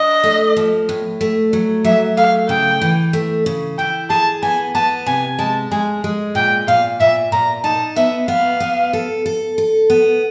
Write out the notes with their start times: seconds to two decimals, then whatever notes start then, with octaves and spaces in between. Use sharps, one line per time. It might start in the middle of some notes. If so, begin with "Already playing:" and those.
Already playing: D4 D#5
0.24 A3
0.57 F3
0.89 A2
1.21 A3
1.53 F#3
1.84 F#3 E5
2.17 A3 F5
2.49 C#3 G5
2.81 E3
3.13 A3
3.46 C#3
3.78 E4 G5
4.10 G#4 A5
4.42 B3 G#5
4.75 B3 A5
5.06 C3 G#5
5.39 G#3 A5
5.71 G#3 G#5
6.04 G#3
6.35 A#2 G5
6.68 A#2 F5
7.00 A#2 E5
7.32 A#2 A#5
7.64 D#4 A5
7.96 B3 E5
8.28 B3 F5
8.60 B3
8.93 A4
9.26 A4
9.58 A4
9.90 B3